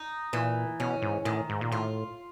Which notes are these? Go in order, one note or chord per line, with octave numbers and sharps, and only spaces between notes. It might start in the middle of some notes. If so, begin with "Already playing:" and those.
Already playing: D#4
A#2 E3
B2 C#4
G#2
A2 D#3
G#2
A#2
A2 F4